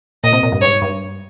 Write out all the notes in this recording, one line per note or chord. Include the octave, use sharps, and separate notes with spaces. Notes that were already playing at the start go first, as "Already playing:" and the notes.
A#2 D#5
C3
A#2
G2
G#2 C#5
G2